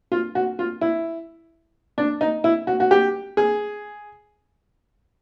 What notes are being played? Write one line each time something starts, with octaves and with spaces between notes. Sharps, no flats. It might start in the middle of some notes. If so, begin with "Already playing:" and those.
F4
F#4
F4
E4
D4
D#4
E4
F#4
F#4
G4
G#4